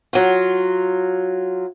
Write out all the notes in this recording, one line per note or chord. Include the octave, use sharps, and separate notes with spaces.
F#3 F4